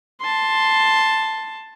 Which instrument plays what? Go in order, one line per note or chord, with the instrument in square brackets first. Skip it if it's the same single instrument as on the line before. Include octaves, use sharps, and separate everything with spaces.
[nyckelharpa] A5 C6